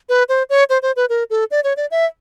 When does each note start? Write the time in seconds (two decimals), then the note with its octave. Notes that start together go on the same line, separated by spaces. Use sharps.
0.09 B4
0.29 C5
0.50 C#5
0.70 C5
0.82 C5
0.96 B4
1.09 A#4
1.30 A4
1.51 D5
1.64 C#5
1.77 D5
1.91 E5